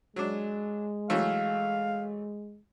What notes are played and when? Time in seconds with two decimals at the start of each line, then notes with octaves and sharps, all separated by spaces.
0.16 F#3 G#3 D4
1.10 E3 F#3 A3 F5